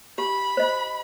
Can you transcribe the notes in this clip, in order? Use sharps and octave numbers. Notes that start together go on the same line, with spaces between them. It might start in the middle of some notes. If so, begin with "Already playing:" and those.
G4 B5
C5 D#5